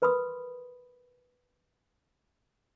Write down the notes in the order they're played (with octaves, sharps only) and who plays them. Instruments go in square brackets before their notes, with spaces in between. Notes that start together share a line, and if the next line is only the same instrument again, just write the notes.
[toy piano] A#4 B4 B5 C6 D#6